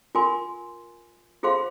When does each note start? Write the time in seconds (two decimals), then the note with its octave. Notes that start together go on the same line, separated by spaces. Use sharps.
0.15 F4 A#4 G#5 C6
1.43 F4 G#4 C5 F5 C6